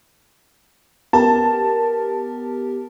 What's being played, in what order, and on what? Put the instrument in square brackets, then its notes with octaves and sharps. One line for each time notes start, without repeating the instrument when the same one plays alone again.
[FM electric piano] B3 G4 A#4 [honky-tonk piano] A5